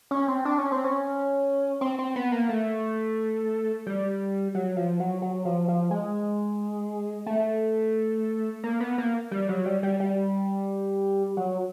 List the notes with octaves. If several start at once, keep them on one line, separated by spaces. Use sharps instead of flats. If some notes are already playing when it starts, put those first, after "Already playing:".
C#4
C4
D4
C#4
C4
C#4
C4
C4
B3
A#3
A3
G3
F#3
F3
F#3
F#3
F3
F3
G#3
A3
A#3
B3
A#3
G3
F#3
G3
G3
G3
F#3